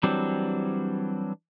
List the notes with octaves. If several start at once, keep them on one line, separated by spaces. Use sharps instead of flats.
E3 F#3 G3 C4 D4